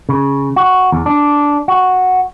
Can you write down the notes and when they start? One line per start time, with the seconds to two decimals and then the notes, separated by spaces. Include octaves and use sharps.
0.09 C#3
0.56 F#4
0.92 E2
1.06 D4
1.68 F#4